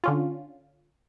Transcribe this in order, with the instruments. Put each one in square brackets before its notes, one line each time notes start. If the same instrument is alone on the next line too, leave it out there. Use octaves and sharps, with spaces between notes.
[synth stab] D3 C#4 F4